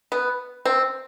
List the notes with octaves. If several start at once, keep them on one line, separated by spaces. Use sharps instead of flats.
B3
C4